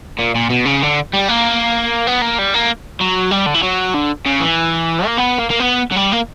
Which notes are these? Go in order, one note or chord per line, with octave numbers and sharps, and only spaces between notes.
A#2
A#2
B2
C#3
D3
G3
A#3
B3
A#3
G3
A#3
F#3
G3
D3
E3
F#3
D3
C#3
E3
A#3
B3
A#3
A#3
B3
F#3
G3
A#3